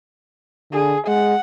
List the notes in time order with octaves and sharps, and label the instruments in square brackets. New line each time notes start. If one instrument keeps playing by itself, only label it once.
[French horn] D3 [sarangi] G#4
[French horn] G#3 [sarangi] F#5